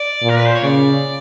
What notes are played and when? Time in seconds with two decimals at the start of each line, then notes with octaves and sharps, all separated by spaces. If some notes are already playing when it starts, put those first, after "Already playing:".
Already playing: D5
0.22 A#2
0.30 A#4
0.38 B4
0.46 C5
0.55 C#5
0.63 C#3 D5